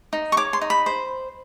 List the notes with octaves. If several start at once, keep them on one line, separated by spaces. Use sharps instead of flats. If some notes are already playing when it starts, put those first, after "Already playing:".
D#4
C#6
C#5 D6
C6
D#4
B5
C5